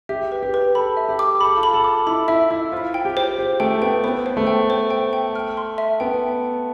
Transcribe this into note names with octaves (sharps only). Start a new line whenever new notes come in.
G4 E5
B4
G4
B4
A4 B5
E5
G4
D6
A4 B5
F4
B5
A4
D6
E4 B5
E4 E5
E4 E5
F4 C5
G5
G4
C5
G4 C5
A3 G5
B3 G5
B3 C5
C5
A3
G5
C5
G5
G5
F6
C6
E5
B3 G5